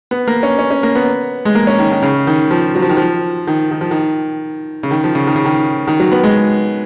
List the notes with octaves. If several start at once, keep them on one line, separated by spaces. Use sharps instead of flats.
B3
A#3
C#4
C#4
C#4
A#3
B3
G#3
A#3
C#4
D#3
D#3
C#3
D#3
F3
F#3
F3
D#3
F3
D#3
D#3
F3
D#3
C#3
D#3
F3
C#3
D#3
C#3
D#3
D#3
F#3
B3
G#3